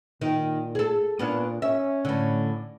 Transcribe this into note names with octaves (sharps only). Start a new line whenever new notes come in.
A#2 D#3
G#4 A4
A#2 B3 C#4 D4
C#4 E5
A2 D3